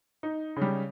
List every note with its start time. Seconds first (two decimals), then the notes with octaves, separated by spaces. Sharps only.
0.23 D#4
0.56 C#3
0.62 G3